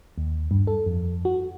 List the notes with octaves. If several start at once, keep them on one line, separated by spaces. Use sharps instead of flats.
D#2
G2
A4
F2
F#4